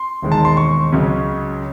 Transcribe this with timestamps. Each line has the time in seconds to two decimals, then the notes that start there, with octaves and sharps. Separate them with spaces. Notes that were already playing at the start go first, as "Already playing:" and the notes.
Already playing: C6
0.22 E1 D#2 D#3 G#3
0.32 A5
0.45 C6
0.57 C#6
0.92 C#2 C#3 F#3 C#4